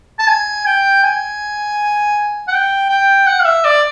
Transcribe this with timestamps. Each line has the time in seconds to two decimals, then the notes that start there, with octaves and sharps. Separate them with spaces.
0.19 A5
0.28 G#5
0.66 G5
1.04 G#5
2.48 F#5
2.53 G5
2.89 G5
3.27 F#5
3.40 F5
3.45 E5
3.65 D5